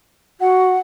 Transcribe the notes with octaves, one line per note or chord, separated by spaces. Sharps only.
F#4 F#5